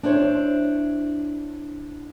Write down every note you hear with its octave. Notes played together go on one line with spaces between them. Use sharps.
D4 E4 C5 C#5